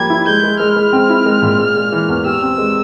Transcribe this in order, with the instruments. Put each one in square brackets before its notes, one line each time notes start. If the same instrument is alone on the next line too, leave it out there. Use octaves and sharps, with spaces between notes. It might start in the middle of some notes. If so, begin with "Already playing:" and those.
Already playing: [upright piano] F3 G3 A#3 [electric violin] G#6
[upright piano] E4
[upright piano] G#3 [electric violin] G6
[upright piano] G#3
[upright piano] G#3 [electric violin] F6
[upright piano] G#3
C4
E4
G#3
A#2
G#3
G#3
E3
E2
[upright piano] G4 [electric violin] E6
[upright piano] C4
G#3